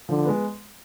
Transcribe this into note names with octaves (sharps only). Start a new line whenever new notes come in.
D3 F3
G#3 B3